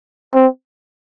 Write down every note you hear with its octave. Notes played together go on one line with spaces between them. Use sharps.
C4